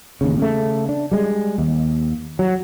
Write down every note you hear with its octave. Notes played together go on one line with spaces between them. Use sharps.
A1 D#2 C#3
C#3 A3
D4
G3 G#3
D#2
F#3